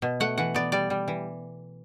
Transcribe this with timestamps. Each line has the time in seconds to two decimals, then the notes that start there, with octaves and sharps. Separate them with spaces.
0.02 B2
0.20 A3 F#5
0.38 E3 F#5
0.54 B3 D5
0.72 G3 D5
0.90 G3
1.08 E3